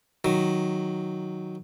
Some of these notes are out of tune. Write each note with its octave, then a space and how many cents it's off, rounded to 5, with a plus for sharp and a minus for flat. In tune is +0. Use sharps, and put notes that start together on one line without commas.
D#3 +0 F#3 +0